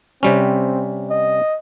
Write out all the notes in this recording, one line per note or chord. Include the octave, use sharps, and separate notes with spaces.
C3 G3 C4 C#4
D#5